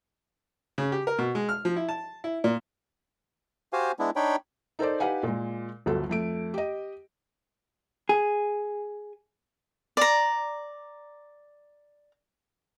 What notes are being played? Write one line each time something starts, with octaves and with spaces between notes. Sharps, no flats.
C#3
G4
A#4
B2
G#3
F6
F3
E4
A5
E4
A#2
F#4 G4 C5 F5 G#5
G#3 B3 D4 E4
D4 D#4 C#5 G5 B5
D#4 A4 A#4 C5 D5
D#4 G4 B4 F5 F#5 G#5
A#2 G#3
G1 D2 F#3 A4
F2 A3 D7
G4 D#5
G#4
D5 A#5